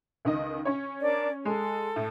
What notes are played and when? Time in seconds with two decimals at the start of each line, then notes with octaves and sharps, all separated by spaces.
0.25 C#2 D#3 D#5
0.65 C#4 C#5
1.01 D4 A#4 D5
1.45 G#3 A4
1.96 A2